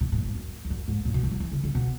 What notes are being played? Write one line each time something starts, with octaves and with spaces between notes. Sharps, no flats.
B2
G#2
A#2
G#2
F#2
E2
F#2
G#2
A#2
B2
D#3
F#3
E3
C#3
C#3
B2